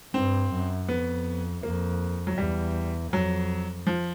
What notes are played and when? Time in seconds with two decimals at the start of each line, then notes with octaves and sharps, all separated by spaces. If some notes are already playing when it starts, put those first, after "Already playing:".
0.14 G2 C4
0.52 F#2
0.89 F2 B3
1.63 F2 A#3
2.27 F#3
2.38 E2 G3
3.12 F2 F#3
3.87 F3